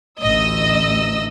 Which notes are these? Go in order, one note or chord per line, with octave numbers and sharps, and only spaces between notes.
A1 D2 D#5 E6